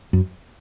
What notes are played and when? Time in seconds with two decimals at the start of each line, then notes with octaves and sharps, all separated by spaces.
0.13 F#2